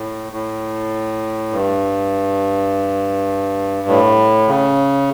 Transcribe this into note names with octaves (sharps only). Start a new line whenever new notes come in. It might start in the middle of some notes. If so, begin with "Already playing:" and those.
Already playing: A2
A2
G2
A2
C#3